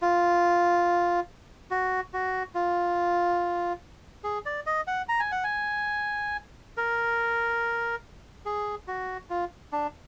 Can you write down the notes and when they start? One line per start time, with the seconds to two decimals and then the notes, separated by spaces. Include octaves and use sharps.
0.02 F4
1.71 F#4
2.13 F#4
2.55 F4
4.24 G#4
4.46 D5
4.66 D#5
4.87 F#5
5.09 A#5
5.20 G#5
5.32 F#5
5.44 G#5
6.77 A#4
8.46 G#4
8.88 F#4
9.30 F4
9.72 D4